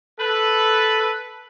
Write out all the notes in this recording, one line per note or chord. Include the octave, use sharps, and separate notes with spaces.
A4 B4